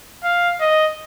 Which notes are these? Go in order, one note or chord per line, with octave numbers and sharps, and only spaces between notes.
F5
D#5